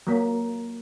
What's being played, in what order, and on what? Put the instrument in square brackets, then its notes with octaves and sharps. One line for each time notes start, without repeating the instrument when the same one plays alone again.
[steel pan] F#3 A#3